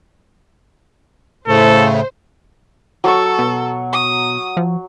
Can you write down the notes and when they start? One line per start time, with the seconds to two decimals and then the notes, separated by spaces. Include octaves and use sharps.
1.48 A2 C#3 A3 A4 C5
3.04 F#3 A4 C#6
3.39 B2
3.93 D#6
4.57 F3